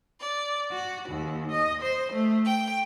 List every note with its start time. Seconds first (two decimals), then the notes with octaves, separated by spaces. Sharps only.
0.21 D5
0.70 F#4
1.08 D#2
1.51 D#5
1.81 C5
2.12 A3
2.44 G5